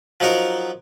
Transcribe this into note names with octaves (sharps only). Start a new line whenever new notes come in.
F3 F#3 D#4 F#4 A#4